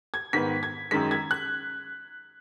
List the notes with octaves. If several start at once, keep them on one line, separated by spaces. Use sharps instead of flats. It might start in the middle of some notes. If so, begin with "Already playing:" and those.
G#6
G#2 D#3 B3 B6
G#6
F#2 D#3 G#3 B6
G#6
F#6